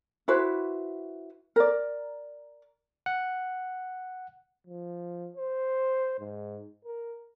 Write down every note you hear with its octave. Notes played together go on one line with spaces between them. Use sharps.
E4 F#4 B4 C5
A#4 D5
F#5
F3
C5
G#2
A#4